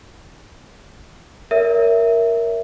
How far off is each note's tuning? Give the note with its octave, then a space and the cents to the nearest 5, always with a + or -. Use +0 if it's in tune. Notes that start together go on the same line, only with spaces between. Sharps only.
A#4 +0 C#5 +40 E5 +0